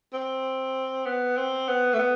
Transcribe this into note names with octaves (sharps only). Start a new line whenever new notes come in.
C4
B3
C4
B3
A3
B3